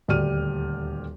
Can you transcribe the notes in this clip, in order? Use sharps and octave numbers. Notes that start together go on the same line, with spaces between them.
D#1 D2 G4 D5 F6 D#7